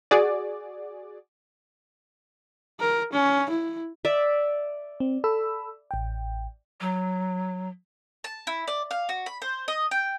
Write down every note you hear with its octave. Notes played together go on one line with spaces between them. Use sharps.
F#4 G#4 D5
A#4
C#4
E4
D5 E5
C4
A4 B5 E6
A1 G5
F#3
A5
E4
D5
F5
F#4
B5
C5
D#5
G5